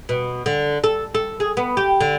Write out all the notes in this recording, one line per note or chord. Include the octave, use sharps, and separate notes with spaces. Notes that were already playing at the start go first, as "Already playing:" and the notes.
B2
D3
A4
A4
G#4
B3
G4
D3